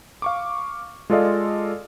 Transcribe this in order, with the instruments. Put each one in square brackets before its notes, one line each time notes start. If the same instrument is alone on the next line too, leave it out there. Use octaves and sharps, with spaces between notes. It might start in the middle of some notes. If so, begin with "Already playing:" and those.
[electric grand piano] F5 C#6 D6
G#3 F4 A4 D5 D#5 F5